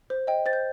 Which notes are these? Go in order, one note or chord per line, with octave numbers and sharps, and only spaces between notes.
C5
D#5 G5
C5 A6
G6